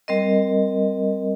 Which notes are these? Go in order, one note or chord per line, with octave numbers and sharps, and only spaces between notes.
G3 C4 A#4 D#5